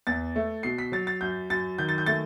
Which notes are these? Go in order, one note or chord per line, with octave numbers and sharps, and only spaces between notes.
E2 A6
A3
B2 C7
B6
F#3 A6
A6
F#2 G6
F#2 A6
D#3 G6
A6
G6
A3 A6